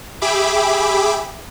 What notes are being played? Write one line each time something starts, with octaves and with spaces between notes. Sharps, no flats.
G4 G#4 E5 B5 D6